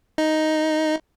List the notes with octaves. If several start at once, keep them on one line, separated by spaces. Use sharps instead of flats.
D#4